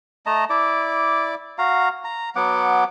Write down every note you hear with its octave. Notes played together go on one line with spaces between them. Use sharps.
A3 D#5 A5 A#5
E4 D5 D6
F#4 F5 A#5
A#5
F#3 B3 F#5 D6